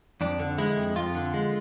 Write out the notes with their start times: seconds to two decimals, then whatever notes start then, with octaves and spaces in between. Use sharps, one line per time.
0.21 F2 D4
0.40 D3
0.58 G#3 E4
0.77 F2
0.96 F2 F4
1.15 D3
1.34 G#3